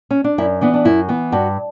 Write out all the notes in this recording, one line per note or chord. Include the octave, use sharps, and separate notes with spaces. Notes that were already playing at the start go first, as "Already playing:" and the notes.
C#4
D4
F#2 E4
E3 B3 D4
D4
F#2 E4
E3 B3
G2 F#4